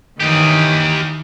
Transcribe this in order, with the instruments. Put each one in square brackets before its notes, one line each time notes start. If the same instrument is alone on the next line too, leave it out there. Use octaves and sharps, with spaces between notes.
[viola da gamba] D#3 E3 [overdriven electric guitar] G4 D#5